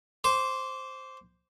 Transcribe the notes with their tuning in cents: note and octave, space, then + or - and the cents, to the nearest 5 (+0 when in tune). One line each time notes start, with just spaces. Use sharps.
C5 +0 D6 -25